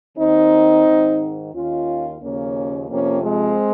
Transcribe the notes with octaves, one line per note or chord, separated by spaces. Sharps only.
D#2 D#3 C4 D#4
G#2 D#3
D#2 D#3 C#4 F4
D#2 C#3 F3 A#3 C#4
F2 C3 F3 A#3 C#4
G#3 C4